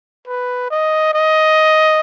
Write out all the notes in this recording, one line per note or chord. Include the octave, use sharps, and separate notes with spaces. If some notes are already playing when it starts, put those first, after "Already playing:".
B4
D#5
D#5